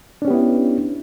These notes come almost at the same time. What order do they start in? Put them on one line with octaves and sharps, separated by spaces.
D4 C#4 G4 B3 E4